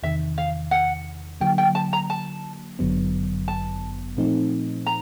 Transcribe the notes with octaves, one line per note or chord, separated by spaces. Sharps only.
E2 C3 D#3 E5
F5
F#5
D3 F#3 A#3 G5
G5
A5
A#5
A5
G1 F#2 D3 F#3 B3
A5
A#2 F3 A3 C4 D#4
A#5